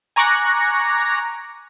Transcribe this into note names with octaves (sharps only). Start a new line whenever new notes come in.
G#5 A#5 C#6 D6 F#6 A#6